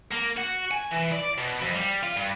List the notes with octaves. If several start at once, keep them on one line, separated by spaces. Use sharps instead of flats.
A#3
F#4
G#5
E3
D5
B2
F2
G3
F4
G2